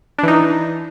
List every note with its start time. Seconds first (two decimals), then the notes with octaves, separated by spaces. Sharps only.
0.18 D4
0.23 E3
0.28 D#4